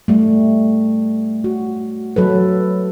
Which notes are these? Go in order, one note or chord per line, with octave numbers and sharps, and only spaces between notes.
G3 A3
F#4
F#3 A4 B4